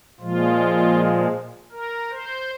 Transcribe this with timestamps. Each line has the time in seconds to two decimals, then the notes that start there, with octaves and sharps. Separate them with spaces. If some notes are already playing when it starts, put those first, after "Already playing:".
0.20 A#2 F3 G#3 F4
1.72 A#4
2.11 C5